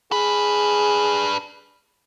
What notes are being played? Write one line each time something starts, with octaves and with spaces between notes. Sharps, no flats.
D4 G#4 B4